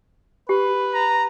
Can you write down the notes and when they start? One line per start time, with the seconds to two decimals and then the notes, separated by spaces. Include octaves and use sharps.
0.49 G4 B4
0.94 A#5